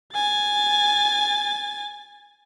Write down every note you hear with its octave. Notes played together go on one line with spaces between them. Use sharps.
G#5 A6